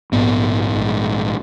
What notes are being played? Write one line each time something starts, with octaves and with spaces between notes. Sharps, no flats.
A#1 G#2 B3
A#1 G#2